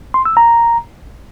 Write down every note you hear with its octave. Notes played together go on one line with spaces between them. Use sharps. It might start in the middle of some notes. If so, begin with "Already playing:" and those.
C6
E6
A#5